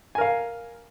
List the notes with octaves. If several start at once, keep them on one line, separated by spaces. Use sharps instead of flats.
A#4 F5 G#5